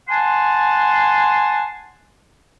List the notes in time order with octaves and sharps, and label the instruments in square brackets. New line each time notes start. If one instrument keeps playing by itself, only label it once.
[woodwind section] F#5 G#5 A5 C6